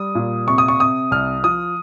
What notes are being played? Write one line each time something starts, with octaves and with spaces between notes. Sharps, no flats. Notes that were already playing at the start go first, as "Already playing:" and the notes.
Already playing: G3 D#6
A#2
C3 C#6
D#6
C#6
C3 D#6
C2 F6
F3 D#6